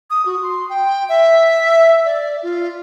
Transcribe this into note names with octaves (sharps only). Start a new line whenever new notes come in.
D#6
F#4
C6
G5
E5
D5
F4